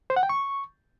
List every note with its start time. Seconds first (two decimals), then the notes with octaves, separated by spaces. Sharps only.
0.10 C5
0.16 F#5
0.23 G5
0.29 C#6